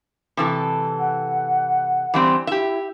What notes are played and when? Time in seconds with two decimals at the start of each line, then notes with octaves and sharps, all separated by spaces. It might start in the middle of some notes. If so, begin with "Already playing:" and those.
0.37 C3 E3 A4
1.00 F#5
2.14 E3 G3 C4
2.47 E4 G4 E5